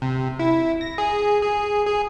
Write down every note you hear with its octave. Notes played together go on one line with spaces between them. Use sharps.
C3
E4
A#6
G#4
G#4
G#4